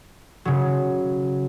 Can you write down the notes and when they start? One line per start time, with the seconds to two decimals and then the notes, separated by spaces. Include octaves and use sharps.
0.45 C#3 F#3